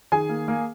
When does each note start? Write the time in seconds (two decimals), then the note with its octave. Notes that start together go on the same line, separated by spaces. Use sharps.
0.12 D#3 G#4 G#5
0.29 A#3
0.48 A#3